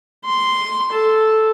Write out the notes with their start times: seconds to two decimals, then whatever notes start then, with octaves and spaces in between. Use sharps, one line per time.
0.25 C6
0.92 A4